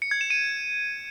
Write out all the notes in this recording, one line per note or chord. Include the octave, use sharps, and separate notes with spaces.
C#7
G#6
E7
D#7